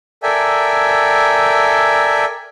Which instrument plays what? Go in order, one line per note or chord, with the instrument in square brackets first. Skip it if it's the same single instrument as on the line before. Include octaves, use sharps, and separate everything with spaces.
[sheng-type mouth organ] A4 A#4 D5 E5 G5 G#5